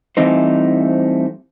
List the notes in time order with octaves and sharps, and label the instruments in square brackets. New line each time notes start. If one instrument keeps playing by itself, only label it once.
[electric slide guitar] E3 G3 A3 C4 D#4 C5